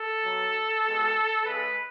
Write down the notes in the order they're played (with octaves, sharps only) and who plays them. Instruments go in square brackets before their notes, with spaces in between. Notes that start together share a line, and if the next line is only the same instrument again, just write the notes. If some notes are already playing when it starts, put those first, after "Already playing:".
Already playing: [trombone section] A4
B2 F#3
B2 G#3
C#3 G#3 B4